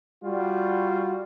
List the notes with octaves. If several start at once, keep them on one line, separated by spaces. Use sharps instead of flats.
G3 F4 F#4